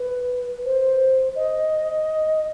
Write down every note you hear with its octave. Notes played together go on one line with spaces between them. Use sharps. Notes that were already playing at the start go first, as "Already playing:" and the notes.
Already playing: B4
C5
D#5